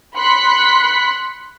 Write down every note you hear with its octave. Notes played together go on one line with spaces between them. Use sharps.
B5 C6 F#6 B6 C#7